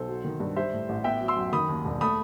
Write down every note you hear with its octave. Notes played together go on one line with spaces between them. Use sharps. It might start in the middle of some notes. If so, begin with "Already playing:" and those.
Already playing: B1 A4 C5
F#3
D#3
G2
G3 C5 E5
A2
A1
B3 E5 G5
F#3
C6 E6
F#2
D#3 B5 D#6
D#2
E1
A3 B5 D#6